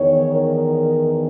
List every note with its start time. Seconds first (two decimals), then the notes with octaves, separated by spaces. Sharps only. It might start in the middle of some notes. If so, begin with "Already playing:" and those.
Already playing: E2 D#3 C#5
0.34 A#4